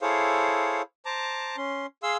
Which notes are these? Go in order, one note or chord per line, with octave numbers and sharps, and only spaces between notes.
E4 G#4 A4 C5 C#5 F5
C5 A5 A#5 D6
C#4 C6
G#4 F5 C6 E6